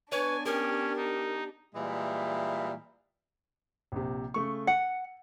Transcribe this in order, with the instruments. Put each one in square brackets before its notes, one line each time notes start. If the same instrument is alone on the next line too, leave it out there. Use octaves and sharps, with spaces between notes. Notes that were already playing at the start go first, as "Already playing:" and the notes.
[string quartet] B3 D4 [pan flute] B4 [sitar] C#5 [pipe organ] G#5
[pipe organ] C#4 [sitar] G4 [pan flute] A#4
[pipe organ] D#4
[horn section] A#2 E3 G3 G#3 E5
[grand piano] A#1 C3
C#3 A3 C#6
[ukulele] F#5 [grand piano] C#7